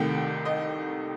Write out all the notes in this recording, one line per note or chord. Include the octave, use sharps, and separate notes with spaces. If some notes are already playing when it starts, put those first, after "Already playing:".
Already playing: C2 C3 D#3 A3 G5
D#5